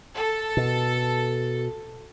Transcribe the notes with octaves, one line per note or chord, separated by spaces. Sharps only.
A4
B2